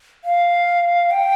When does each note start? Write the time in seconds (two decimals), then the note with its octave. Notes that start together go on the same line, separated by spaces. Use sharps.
0.24 F5
1.11 G5